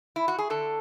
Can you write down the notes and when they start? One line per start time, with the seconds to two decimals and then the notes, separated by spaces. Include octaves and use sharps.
0.16 E4
0.28 F#4
0.39 G#4
0.50 D3 A4